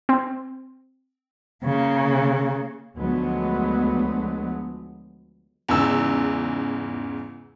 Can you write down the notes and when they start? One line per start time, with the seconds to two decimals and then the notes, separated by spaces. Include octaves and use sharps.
0.09 C4
1.65 C#3 A#3
2.97 D2 F3 F#3 G#3 B3
5.69 E2 G#2 C#3 E6